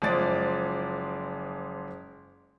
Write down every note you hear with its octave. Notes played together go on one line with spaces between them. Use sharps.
F#1 F3 G#3 D5 A6